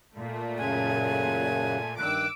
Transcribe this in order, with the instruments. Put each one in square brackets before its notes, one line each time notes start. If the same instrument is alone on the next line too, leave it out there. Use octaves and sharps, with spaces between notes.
[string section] A#2 A3
[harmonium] F#2 C#3 F#5 [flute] G#5
[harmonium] G2 D#3 [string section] D6 E6 [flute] F#6